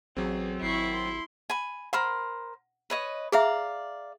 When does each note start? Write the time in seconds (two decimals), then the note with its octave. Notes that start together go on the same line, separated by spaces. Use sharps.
0.17 A1 F#3 C4 G#4
0.62 G#1 E4 C#6 C7
0.93 C6
1.50 G#5 B5
1.93 A#4 C5 F#5 B5
2.90 B4 C#5 D#5
3.32 G#4 D5 E5 F5 A#5